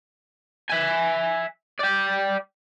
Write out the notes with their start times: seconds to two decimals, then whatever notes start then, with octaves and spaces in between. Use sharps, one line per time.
0.70 E5 G#5
1.80 D5 G5